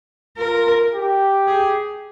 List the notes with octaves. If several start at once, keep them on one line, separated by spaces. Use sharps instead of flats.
F4 A#4
G4
G#4